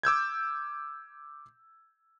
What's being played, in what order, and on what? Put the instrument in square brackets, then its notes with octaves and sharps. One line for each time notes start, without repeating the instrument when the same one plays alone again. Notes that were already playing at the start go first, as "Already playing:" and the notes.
[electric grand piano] D6 E6 G6 G#6